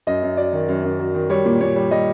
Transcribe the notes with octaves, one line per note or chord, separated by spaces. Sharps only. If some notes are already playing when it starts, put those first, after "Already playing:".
F#2 D#5
F#2
F#3 D5
D#3
F#2
F#2
F#3
D#3
G3 C#5
A#2
A#2 C#5
G3
G3 D#5